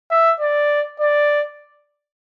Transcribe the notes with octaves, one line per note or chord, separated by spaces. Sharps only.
E5
D5
D5